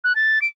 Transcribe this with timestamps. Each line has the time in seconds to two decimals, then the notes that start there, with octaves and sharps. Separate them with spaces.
0.04 F#6
0.15 A6
0.42 D7